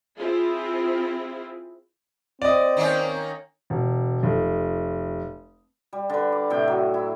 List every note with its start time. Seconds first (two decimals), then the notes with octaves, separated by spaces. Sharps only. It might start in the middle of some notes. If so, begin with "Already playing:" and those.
0.18 C4 E4 F4 G#4
2.42 C4 D5 D#5
2.77 D#3 A#3 C#4
3.70 E1
4.23 F1
5.93 G3
6.10 D3 B4
6.32 D6
6.50 A2 C3 G5
6.68 F#3
6.94 E4